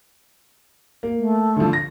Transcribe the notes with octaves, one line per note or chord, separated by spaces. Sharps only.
A#3
A3
D3 F3
A#6